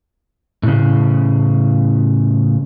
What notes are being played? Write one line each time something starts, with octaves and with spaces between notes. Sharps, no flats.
A2 C#3